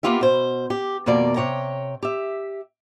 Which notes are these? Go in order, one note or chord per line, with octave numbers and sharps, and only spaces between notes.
A#3 B3 F4 G4 E5
B2 C5
G4
F2 B2 D#3 A#3 D5
C3 C#5 G5 A#5
G4 E5